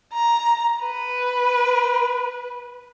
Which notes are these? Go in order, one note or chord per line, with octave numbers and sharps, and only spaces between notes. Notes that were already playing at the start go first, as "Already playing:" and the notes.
A#5
B4